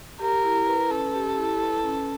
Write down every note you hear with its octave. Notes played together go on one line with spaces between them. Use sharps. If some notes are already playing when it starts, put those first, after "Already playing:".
G4 A#4
E4
B4
C#4 A4
G4
E4
B4
C#4